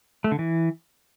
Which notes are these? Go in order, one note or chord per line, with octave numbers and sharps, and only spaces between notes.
A3
D3
E3